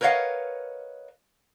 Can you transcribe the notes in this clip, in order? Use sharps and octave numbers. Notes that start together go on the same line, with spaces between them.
A#4 B4 C#5 D#5 F5 F#5